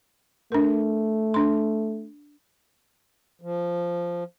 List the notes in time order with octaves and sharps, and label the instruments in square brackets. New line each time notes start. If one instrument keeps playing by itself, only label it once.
[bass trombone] A3 [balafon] D4 A#4
[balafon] D4 C6
[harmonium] F3